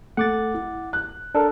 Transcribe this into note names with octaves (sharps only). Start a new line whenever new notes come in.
A3 F#5 D6 A6
E4
F#6
D4 A4 A#4